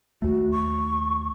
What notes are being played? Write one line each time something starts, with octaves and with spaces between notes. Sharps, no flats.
D#2 A3 F#4
C#6